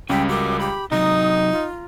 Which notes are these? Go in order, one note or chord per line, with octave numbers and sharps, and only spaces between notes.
C#2 G3 C#4 G5 B6
F#4 A#4 D6
G4 B5
C3 F#3 D#4 A#5 D#6
F4